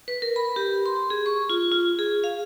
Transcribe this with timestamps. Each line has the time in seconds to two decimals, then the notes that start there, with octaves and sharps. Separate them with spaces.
0.08 B4
0.22 A#4
0.36 B5
0.56 G4
0.86 C6
1.10 G#4
1.26 C#6
1.50 F4
1.72 F4
1.99 G#4
2.24 F5